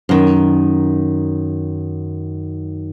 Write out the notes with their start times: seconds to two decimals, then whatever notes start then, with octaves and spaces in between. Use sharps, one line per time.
0.09 F#2 D#3